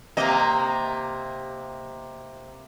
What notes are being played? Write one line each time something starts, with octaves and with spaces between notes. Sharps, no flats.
C3 A#3 D#5